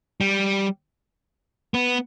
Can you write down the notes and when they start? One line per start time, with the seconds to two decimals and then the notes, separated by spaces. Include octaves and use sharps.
0.21 G3
1.74 B3